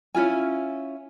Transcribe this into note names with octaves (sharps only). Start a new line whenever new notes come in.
C#4 E4 F4 G#5